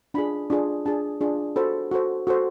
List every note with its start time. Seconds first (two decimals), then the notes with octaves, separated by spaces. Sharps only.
0.14 D4 F4 G#4 B5
0.50 D4 F4 G#4
0.85 D4 F4 G#4 A5
1.21 D4 F4 G#4
1.56 F#4 A4 C5 B5
1.91 F#4 A4 C5
2.27 F#4 A4 C5